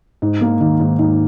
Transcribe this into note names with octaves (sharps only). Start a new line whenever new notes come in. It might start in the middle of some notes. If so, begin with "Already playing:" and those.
G#2
A#3
D#3
G#2
G#2